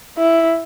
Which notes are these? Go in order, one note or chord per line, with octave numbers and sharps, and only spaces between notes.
E4